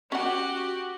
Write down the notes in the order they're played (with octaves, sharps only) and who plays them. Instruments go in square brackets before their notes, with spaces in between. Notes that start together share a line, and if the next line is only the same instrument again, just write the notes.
[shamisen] C#4 F#5 [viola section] F#4 [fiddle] G4